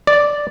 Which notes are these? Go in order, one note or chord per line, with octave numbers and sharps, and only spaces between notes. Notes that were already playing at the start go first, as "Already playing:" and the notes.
D5